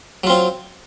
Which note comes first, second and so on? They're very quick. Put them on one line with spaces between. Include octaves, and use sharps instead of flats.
F#3 F4 C4